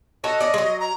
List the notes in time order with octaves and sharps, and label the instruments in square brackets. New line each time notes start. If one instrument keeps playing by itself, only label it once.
[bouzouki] F#4 A4 C#5 [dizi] D#5
[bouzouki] C#4 D5
F#3 G#3
[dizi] A#5